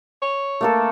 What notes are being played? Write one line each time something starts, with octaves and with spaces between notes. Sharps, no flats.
C#5
A3 A#3 A4